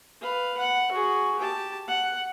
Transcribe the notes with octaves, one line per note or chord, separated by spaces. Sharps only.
B4 F5
F#5
F#4 G#4
G4 A5
F#5